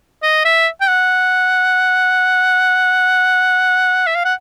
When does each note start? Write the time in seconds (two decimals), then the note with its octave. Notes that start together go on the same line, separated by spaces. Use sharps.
0.22 D#5
0.45 E5
0.81 G5
0.88 F#5
4.06 E5
4.15 F5
4.25 F#5